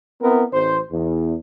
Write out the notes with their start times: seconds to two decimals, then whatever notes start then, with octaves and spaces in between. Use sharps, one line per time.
0.21 B3 C4 E4 A#4
0.51 A1 C5
0.90 E2